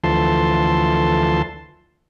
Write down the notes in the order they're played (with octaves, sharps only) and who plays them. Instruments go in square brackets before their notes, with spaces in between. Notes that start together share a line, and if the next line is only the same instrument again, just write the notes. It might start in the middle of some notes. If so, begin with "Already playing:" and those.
[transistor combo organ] D2 E3 F3 A4 A5 C6